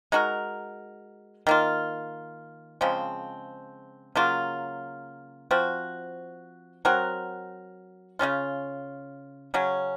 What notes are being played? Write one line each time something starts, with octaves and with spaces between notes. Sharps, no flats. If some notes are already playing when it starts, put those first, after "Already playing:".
G#3 D#4 F#4 A#4
D#3 A#3 F4
C#3 F3 G#3 C4
C#3 F#3 A#3 F4
F3 C4 F#4
F#3 C4 F#4 A#4
C#3 F#3 C#4 F4
C#3 F#3 C#4